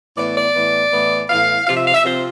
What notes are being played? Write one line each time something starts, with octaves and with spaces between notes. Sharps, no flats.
A2 E3 B3 D5
D5
A2 E3 B3
A2 E3 B3
A2 E3 B3 F5
C3 F3 C4 F4 F5
E5
F5
E5
C3 F3 C4 F4 C5